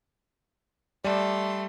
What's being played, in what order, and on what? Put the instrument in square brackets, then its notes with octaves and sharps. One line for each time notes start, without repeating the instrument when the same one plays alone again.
[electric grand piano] G3 [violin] A3 C6 [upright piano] D5